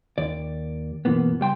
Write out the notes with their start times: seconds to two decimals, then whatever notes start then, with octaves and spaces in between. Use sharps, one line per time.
0.18 D#2 D5
1.05 F#2 B2 E3 A#3 B3
1.40 C#2 G3 G5 C6